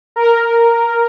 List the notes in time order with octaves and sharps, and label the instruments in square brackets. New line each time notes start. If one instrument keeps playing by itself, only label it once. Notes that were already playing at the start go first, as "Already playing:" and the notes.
[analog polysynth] A#4